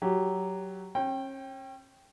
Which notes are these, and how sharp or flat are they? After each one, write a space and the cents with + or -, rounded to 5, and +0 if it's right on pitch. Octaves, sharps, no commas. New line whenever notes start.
F#3 +10 G4 +0
C#4 -40 G5 +0